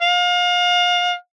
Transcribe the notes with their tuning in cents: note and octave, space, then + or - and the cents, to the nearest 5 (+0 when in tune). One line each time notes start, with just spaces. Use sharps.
F5 +30